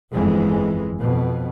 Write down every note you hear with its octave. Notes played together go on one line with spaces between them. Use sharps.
G1 F2 E3 G#3
F2 B2